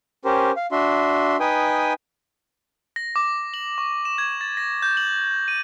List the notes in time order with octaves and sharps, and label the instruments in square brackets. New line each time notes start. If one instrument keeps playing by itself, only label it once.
[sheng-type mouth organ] C#4 G4 A#4 C5
F5
D4 F#4 E5 C6
D#4 B4 G5 G#5 D#6
[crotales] A#6
D6
F#7
C#6
E7
G#6
A6
A#6
G6
F#7
D#7